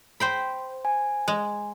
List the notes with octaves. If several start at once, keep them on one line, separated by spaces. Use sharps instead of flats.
C5 G5 B5
G#5
G#3